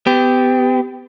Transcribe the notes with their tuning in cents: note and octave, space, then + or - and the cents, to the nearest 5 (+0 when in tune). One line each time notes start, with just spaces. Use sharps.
B3 +30 G4 +0